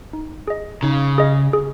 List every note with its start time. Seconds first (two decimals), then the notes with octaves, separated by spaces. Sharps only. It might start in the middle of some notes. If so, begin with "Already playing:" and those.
0.13 D#4
0.48 G#4 D#5
0.83 C#3 D#4
1.18 G#4 D#5
1.53 G#4